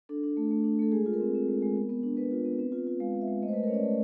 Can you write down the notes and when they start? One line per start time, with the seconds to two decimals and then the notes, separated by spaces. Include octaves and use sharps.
0.09 D4 A4
0.24 D4
0.37 A3
0.51 A3
0.64 D4
0.79 A3 A4
0.92 G#3 G#4
1.06 F4
1.13 A#4
1.21 C4
1.35 C4
1.48 G#3
1.62 G#3
1.76 B3
1.89 B3
2.03 D4
2.17 B3 B4
2.31 F4
2.45 B3
2.59 C4
2.72 F4
2.87 F4
3.00 G#3 F5
3.15 G#3
3.21 E5
3.28 G#3
3.42 A3 D#5
3.48 C5
3.53 B4
3.56 A3
3.63 A#4
3.68 C#5
3.71 C#4 D5
3.84 A3